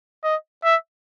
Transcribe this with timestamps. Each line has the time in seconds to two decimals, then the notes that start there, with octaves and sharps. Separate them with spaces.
0.24 D#5
0.64 E5